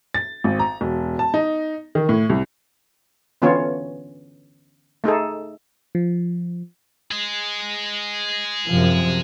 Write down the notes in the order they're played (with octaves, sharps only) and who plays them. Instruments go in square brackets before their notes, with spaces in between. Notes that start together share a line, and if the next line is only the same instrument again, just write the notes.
[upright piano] A6
G#1
A#5
E1
A5
D#4
D#3
A2
C2
[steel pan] D3 E3 B3 C#4 F4 C#5
A3 D#4 G#4 A4
[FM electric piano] F3
[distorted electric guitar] G#4 D#5
[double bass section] F#2 C3 F3